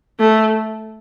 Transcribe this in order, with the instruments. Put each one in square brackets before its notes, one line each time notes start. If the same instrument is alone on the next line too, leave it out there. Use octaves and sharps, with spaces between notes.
[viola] A3